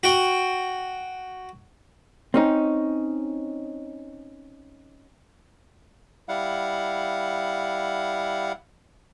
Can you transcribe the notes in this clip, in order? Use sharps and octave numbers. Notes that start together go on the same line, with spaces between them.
F#4 G5
C4 C#4 D#4
G3 E4 F5 F#5